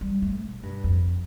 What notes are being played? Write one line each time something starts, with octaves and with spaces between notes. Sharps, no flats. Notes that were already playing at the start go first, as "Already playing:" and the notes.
G3
A3
B2
G2
F2